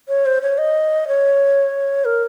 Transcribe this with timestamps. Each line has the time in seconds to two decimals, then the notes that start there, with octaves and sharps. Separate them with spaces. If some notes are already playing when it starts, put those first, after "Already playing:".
0.08 C#5
0.26 C5
0.42 C#5
0.58 D#5
1.08 C#5
2.05 A#4